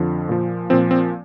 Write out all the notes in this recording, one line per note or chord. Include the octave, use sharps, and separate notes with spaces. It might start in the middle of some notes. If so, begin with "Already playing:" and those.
Already playing: F2 D3 F3
A#2 F3
A#2 F3 C4
C4